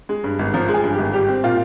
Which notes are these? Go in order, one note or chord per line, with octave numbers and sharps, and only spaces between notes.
G#3
G2
G#1
F3 A#4
G#3
G#4
G2
G4
G#1
G3 G4
C4
A#2 F4